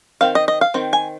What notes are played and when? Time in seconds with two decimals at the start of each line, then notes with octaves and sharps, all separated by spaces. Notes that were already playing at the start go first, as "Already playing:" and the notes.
0.21 D#3 C4 F5
0.35 D#5
0.48 D#5
0.61 F5
0.74 D#3 C4
0.93 G#5